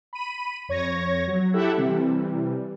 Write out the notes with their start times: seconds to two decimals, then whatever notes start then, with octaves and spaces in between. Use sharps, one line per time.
0.13 B5 D#7
0.69 F2 C#5 C#6 G#6 A#6
1.27 F#3
1.53 E4 G4 A4 E5 F#5
1.78 C3 E3 G3